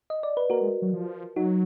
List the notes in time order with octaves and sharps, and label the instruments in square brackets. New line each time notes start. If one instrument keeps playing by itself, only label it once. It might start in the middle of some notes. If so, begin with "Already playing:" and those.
[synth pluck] D#5
D5
B4
[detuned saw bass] A#3 [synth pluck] F#4 A#4
[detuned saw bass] G#3
F#3
F3
[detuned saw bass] F#3 [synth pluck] D#4 F#4